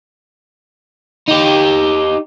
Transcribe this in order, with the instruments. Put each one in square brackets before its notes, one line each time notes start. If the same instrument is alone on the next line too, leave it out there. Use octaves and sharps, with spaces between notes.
[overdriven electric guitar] D#4 G4